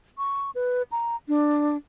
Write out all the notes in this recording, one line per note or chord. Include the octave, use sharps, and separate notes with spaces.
C#6
B4
A#5
D4